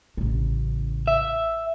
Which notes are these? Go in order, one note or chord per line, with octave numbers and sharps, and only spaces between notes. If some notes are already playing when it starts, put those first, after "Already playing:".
A1 C#3
E5